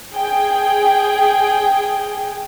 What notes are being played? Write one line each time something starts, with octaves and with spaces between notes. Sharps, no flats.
G#4 G5